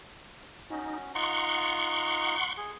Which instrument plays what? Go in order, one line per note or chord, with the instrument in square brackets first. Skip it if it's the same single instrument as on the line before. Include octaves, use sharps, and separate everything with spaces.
[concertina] C#4 F#4 [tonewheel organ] D#4
[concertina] D#4 F4 A#5 [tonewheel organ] F#5 C6 C#6
[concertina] G#4